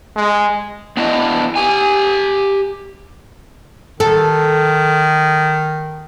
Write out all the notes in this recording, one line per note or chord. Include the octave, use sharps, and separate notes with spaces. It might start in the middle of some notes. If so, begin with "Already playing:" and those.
G#3
B3 D4 E4 D#5
G4 G#5
D#3 A4